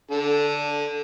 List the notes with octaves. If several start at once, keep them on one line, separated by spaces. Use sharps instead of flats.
D3 A4